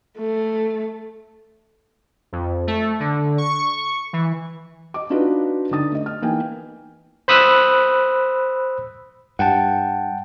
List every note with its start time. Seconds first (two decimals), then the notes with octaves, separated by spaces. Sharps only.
0.18 A3
2.32 F2
2.67 A3
3.00 D3
3.38 C#6
4.13 E3
4.94 D#5 D6
5.10 D4 D#4 F4 F#4 B4
5.71 D3 D#4 D#6 A6
5.92 A3 D#5
6.06 F6
6.22 E3 A#3 B3 D#4 G5 G#5
7.28 C5 B5 D#6 E6 F#6
9.39 G2 F#5 G5 A5